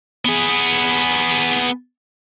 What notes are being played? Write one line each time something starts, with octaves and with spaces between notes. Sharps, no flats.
B3 G#4